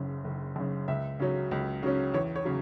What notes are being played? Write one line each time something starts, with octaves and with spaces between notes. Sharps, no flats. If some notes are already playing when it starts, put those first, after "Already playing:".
Already playing: F#1 F#2 C#3
F#1
F#2 C#3
C#2 E5
C#3 F#3 C#4
C#2
C#3 F#3 C#4
E2 C#5
C#5
C#3 F#3